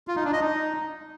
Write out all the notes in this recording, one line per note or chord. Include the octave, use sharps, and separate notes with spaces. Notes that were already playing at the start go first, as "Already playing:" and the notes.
F4
D#4
D4
D#5
D#4